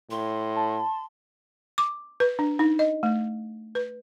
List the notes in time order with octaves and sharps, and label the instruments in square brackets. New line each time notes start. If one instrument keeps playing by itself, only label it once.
[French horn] A2 [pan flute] C6
[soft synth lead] A5
[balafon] D6
B4
D4
D#4
D#5
A3
B4